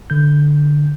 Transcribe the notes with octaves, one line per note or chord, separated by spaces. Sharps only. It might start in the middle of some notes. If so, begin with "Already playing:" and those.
D3 G6